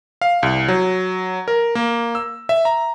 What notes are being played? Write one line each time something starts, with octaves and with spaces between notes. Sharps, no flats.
F5
C2
F#3
A#4
A#3
E6
E5
A#5